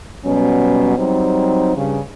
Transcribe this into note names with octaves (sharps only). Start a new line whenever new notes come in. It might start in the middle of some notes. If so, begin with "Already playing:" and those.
B2 F#3 G3 C#4
F#3 G3 C4 D#4 C5
G2 C#3